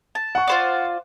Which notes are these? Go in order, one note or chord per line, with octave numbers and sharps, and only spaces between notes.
A5
F#5 C#6
F4 C5 D5